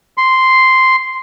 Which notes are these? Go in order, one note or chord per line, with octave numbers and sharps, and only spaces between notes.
C6